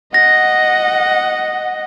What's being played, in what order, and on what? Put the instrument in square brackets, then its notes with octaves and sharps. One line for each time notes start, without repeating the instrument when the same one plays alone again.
[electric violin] D#5 F#5 [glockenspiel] A#6